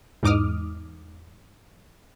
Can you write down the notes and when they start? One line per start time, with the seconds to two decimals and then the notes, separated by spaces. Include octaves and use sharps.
0.23 E2 G#2 D#4 D6 D#6 F6